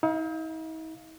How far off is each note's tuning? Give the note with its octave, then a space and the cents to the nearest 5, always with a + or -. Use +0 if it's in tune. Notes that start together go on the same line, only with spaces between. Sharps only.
D#4 +45 F5 +0